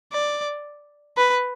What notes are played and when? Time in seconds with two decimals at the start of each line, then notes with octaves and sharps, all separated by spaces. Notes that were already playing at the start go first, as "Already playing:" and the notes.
0.12 D5
1.17 B4